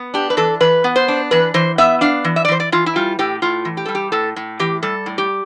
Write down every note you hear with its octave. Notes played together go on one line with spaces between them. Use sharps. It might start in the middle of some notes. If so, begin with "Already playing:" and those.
Already playing: B3
D4 G4
B4
E3 A4
E3 B4
B3
C5
D4
E3 B4
E3 C5
B3 E5
D4 F5
E3
E5
D5
E3 C5
D5
E3 F4
E4
G3 F4
A2 G4
A2 F4
E3
G4
G3 A4
G4
A2 A4
A2
E3 G4
G3 A4
A2
G4